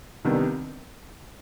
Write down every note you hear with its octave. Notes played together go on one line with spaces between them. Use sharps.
C2 C3 D#3 B3 D4